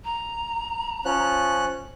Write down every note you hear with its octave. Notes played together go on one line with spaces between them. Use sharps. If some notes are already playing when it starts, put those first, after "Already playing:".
A#5
F3 C#4 F#6